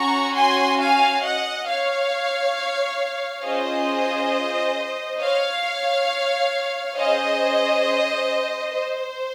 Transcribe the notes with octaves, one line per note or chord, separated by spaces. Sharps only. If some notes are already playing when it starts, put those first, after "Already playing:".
Already playing: C#4 F#4 A#5 C#6
G#5 C6
F5 G#5
D#5 F#5
C#5 F5
C#4 F4 G#4 C5 D#5
C#5 F5
C#4 G#4 C5 D#5
C5